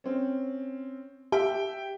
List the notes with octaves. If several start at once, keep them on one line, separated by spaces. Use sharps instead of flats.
C4 C#4
G4 E5 G5